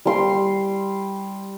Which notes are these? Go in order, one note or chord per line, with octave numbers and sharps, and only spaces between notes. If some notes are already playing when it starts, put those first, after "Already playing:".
G3 C6